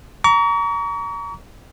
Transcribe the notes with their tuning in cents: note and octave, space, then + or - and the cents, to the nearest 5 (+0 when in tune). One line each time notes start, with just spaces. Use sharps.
A#5 +0 C#6 +40